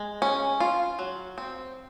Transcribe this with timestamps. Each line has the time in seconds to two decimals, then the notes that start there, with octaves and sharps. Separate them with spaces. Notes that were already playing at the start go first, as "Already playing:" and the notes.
Already playing: G#3
0.22 C#4
0.60 F4
0.99 F#3
1.38 C4